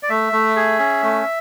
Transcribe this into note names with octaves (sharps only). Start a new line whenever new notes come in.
D5
A3 E5
A3
G#4
C#4
A3